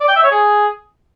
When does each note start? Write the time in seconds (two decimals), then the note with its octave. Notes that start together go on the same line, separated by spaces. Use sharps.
0.01 D5
0.08 G5
0.16 E5
0.24 C#5
0.31 G#4